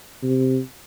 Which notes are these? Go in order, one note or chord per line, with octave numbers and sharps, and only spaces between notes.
C3